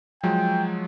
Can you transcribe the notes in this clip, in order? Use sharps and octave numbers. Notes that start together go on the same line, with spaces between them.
F3 F#3 G#3 G5